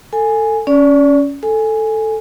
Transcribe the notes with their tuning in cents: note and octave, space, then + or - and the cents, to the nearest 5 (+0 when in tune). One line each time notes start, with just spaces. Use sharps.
A4 +20 G#5 +0
C#4 +10 D5 -25
A4 +0 G#5 +0